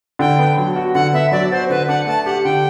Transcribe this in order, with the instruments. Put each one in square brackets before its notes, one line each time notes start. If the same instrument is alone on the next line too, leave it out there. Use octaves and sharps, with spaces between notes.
[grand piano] D3 [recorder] G5
[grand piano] B3
F#3
F#4
[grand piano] D3 [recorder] F#5
[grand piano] B3 [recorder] E5
[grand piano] F#3 [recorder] D5
[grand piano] F#4 [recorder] C5
[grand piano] D3 [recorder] B4
[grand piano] D4 [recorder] F#5
[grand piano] A3 [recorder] A5
[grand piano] G4 [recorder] F#5
[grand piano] D3 [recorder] G5